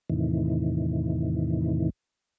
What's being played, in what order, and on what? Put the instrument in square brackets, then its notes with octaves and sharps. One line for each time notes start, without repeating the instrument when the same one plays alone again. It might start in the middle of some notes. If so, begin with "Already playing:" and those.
[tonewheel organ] E2 A2 C3 D#3 E3